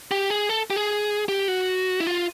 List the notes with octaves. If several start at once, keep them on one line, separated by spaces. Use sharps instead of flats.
G4
G#4
A4
G4
G#4
G4
F#4
E4
F4